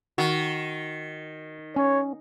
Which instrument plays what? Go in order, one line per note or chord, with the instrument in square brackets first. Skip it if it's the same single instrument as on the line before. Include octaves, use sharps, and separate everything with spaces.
[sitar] D#3 [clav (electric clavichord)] F#4
[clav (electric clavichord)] C#4 [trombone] C#5